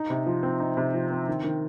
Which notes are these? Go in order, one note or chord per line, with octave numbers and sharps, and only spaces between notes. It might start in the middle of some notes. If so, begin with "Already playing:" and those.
Already playing: D#4
C3
F3
C4
D#4
C3
F3
C4
D#3
D#3